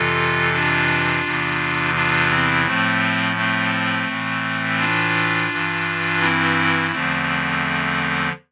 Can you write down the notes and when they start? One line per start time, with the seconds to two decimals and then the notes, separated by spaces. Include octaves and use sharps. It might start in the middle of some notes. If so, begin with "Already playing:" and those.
Already playing: F2 C3 E3 F4 A4
0.53 D4 F4
1.24 E2 C3 E3
1.95 D4 F4
2.30 C4 E4
2.66 A2 F3 A3 C4
3.36 A3 C4
4.08 A2 E3
4.78 D4 F4
5.50 G2 E3
6.20 C4 E4
6.91 E2 D3 F3 A3 C4